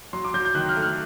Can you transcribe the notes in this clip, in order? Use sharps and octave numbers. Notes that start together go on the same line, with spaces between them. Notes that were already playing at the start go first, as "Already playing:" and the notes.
F#3 C6
D6
F#3 G6
G6
D#3 F#6
F6
A3
F6